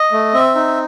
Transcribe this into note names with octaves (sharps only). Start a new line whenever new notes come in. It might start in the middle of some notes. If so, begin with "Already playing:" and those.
Already playing: D#5
A3
C4 E5
D#4